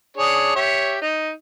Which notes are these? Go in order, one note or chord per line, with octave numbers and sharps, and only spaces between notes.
D4 G#4 C#5
G4 C#5 E5
D#4